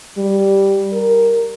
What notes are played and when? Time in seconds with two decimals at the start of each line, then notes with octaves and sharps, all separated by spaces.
0.17 G3
0.93 A#4